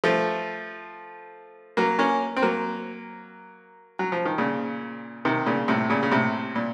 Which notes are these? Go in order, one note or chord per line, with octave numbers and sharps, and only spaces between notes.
F3 A3
F#3 A#3
A#3 C#4
C4
F#3 A#3
F#3
F3
D#3
A#2 C#3
C3 D#3
A#2 C#3
A2 C3
A#2 C#3
C#3
A2 C3
A#2